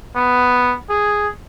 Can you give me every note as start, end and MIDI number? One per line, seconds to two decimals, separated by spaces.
0.16 0.75 59
0.90 1.28 68